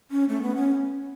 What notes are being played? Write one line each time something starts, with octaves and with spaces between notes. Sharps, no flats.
C#4
A3
B3
C#4